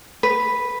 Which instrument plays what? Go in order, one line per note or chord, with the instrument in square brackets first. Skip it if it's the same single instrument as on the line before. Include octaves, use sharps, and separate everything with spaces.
[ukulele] B4